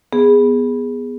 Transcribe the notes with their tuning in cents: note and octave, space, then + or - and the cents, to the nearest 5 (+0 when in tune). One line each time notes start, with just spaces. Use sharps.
B3 -5 G#4 -10